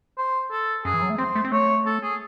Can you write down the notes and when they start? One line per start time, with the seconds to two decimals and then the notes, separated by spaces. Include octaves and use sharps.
0.18 C5
0.51 A4
0.85 F#2 G#4
0.94 E3
1.02 F#3
1.10 A3
1.18 C4 C5
1.35 A3
1.44 C4
1.52 A3 C#5
1.86 A4
2.03 G#4